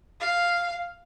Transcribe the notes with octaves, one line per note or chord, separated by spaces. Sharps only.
F5